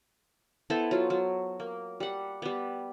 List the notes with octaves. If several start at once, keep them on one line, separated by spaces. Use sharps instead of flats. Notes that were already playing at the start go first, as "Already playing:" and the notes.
B3 E4 A4 C5
F#3 F4
F#3
A#3
G3 F#5
G3 B3